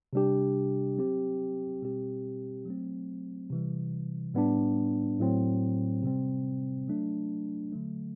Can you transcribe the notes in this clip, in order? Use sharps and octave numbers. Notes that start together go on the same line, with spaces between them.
C3 G3 D4 G4
F#3 C4 G4
B2 G3 C4 G4
F#3 A3 C4
C3 E3 G3
A2 G3 B3 D4
A2 F#3 C4
C3 G3 C4
F#3 A3 D4
D3 F#3 A3